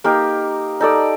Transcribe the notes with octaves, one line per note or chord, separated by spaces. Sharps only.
A#3 D#4 G4 A#4
D#4 A4 D5